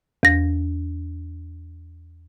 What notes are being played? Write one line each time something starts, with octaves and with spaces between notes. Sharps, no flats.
E2 A#6